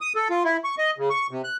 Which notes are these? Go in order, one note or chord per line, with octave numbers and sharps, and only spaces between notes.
D#6
A4
F4
E4
C#6
D#5
C#3
C#6
C3
F#6